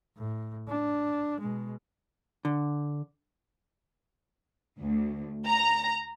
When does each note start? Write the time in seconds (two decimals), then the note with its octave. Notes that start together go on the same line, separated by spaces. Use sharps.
0.17 A2
0.68 D4
1.40 B2 G#3
2.45 D3
4.78 D2
5.46 A#5